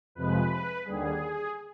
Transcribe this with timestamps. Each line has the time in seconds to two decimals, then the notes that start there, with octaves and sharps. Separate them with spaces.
0.15 F2 C3 F3 G#3 B4
0.85 D#2 D3 G3 G#4